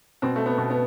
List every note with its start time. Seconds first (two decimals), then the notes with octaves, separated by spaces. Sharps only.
0.22 B2 C4
0.36 A3
0.46 B3
0.58 B2
0.70 B3